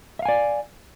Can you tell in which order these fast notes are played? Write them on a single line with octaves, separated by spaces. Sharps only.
E5 F5 G#5 D5